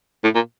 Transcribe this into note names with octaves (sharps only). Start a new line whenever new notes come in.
A2
A#2